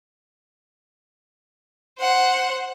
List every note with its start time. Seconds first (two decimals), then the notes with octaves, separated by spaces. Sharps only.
1.99 C5 F#5